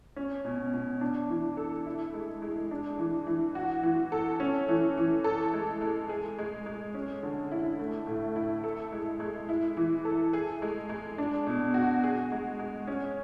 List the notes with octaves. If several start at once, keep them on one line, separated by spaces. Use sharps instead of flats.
C#4
B2
B2
D4
E3
A4
E4
G#3
G#3
D4
E3
E3
F#4
E3
A4
C#4
E3
E3
A4
G#3
G#3
G#4
G#3
G#3
C#4
D3
E4
A3
A2
E4
A4
G#3
G#3
E4
E3
A4
G#4
G#3
G#3
D4
B2
F#4
G#4
G#3
G#3
C#4